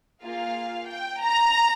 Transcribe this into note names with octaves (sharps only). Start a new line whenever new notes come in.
A#3 F4 G#4 F5
G5
A#5